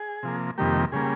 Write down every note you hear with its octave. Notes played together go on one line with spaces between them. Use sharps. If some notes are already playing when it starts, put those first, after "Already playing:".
Already playing: G#4
C3 F3 A#3
F2 C3 D#3 G3 A#3 G4
C#3 G3 A#3 G#4